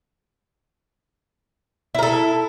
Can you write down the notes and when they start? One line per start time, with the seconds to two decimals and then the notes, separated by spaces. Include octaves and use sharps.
1.95 E4
1.99 A#4
2.03 A4